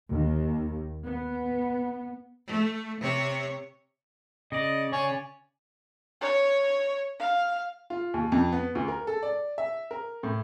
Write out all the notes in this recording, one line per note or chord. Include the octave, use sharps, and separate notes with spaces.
D#2
B3
A3
C3 C#5
C#3 D5 D#5
C#3 C#5 D5 G#5
C#5
F5
F4
D#2
F2
B3
D2
A#4
A4
D5
E5
A#4
A2